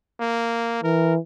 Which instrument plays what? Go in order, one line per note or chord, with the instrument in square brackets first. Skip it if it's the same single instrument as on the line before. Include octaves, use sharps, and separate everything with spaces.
[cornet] A#3
[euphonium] E3 [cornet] A#4